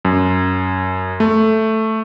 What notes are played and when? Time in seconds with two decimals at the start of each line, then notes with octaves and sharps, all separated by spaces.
0.05 F#2
1.20 A3